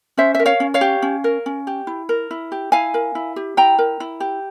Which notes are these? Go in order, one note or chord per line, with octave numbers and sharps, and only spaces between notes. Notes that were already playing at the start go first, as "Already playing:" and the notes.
C#4 C5 E5
A#4 E5
C#5 F5
C#4
C#5 F5
G4
C#4
A#4
C#4
G4
E4
A#4
E4
G4
E4 F5 G#5
A#4
E4
G4
E4 G5 A#5
A#4
E4
G4